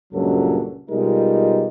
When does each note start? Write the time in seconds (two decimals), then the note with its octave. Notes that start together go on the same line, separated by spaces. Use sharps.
0.14 C#2 G2 A#2 F#3 C#4 A4
0.90 B2 G3 G#3 D#4 F4 A#4